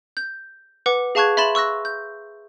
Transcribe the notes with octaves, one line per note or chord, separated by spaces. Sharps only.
G6
B4 F#5 D6
G#4 F5 A5 C#6 F#6 G#6
E5 B5 C6 A6 E7 F#7
C#6 E6 F#6 A#6
G6